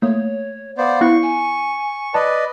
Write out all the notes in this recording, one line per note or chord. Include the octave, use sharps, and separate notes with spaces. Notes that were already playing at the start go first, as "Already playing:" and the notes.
A3 A#3 C#5
B3 C5 D5 F5
B3 E4 C#6 F#6
G#5
B4 D5 D#5 A5